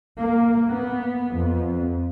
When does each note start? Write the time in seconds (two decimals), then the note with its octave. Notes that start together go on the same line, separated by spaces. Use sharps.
0.17 A#3
0.72 B3
1.35 F2